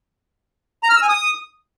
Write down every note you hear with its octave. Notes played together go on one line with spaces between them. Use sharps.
A#5
F6
E6
G#5
D#6